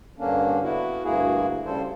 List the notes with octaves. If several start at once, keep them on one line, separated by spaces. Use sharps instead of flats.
G2 D3 A#3 C#4 D4
B3 E4 F#4
D2 G2 A#3 E4 F#4 G#4
C#3 G3 A4 C5